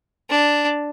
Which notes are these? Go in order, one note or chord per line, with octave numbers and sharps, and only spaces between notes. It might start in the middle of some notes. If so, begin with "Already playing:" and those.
D4